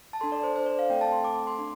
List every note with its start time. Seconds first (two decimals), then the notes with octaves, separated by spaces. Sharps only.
0.13 A5
0.21 D4 A4 C6
0.32 D5
0.43 C5
0.56 C5
0.66 D5
0.79 F5
0.90 A3 C4 A4 G5
1.01 A5
1.12 C6
1.24 D6
1.36 D6
1.47 C6
1.59 D4